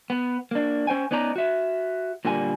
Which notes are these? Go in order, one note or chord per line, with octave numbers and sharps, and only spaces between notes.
B3
A#3 D4
C#4 C5 G5 G#5
B3 C#4 D#4 D5 A#5
F#4 E5
A#2 D3 G3 A#3 G#5